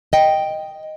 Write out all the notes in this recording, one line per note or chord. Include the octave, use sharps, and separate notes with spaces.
D#5 G5